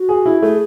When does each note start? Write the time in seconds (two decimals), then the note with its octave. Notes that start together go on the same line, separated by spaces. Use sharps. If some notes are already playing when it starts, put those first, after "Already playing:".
Already playing: F#4
0.09 G#4
0.26 E4
0.42 A3 G#4